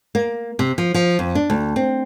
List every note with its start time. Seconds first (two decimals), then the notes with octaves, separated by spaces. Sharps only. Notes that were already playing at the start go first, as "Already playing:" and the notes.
0.15 A#3
0.59 C3
0.78 F3
0.94 F3
1.19 F2
1.35 D4
1.50 D2
1.76 C4